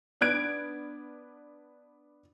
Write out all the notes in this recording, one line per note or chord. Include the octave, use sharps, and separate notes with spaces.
B3 D4 F#6 G#6 D7